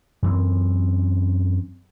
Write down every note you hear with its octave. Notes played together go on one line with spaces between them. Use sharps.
F#2 E3 C4